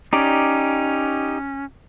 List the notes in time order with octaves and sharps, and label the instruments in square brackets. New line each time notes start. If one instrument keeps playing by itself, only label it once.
[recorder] C#4 [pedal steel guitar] D#4 G4 D5